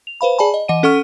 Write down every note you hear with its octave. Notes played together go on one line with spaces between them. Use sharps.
F7
B4 C5 F5 B5
G#4 D5 G#5 A5 B5
D#5
E3 D#5 F#5 D#7
C#4 A4 F#5 C#6 F6 D#7